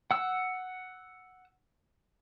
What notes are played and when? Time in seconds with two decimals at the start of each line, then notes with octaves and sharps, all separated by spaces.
0.11 F#5 E6